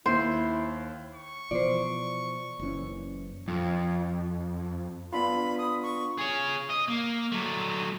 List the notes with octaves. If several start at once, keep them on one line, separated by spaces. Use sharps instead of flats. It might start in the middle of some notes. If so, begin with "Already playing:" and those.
D#2 E4 C5
C#6
B2 E3 F3 C5 D5
F#1 E3 C#4
F2
B3 D4 F4 B5
D#6
C#6
G#4 C#5
D#5
A#3
F#3 A3